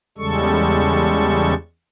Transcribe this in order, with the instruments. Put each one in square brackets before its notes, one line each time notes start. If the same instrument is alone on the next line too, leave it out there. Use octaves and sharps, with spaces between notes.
[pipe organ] E2 C#3 G3 G#3 A4 C#6